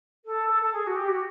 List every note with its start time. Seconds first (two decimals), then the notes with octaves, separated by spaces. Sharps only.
0.25 A4
0.49 A4
0.62 A4
0.72 G#4
0.86 F#4
0.95 G4
1.08 F#4